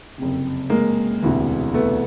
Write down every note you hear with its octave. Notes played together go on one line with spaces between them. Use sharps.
F#1 F2 C3
G#3 A#3
E1 D2 C3 E3
A3 B3